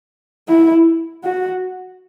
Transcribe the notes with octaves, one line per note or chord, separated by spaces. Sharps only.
E4
F#4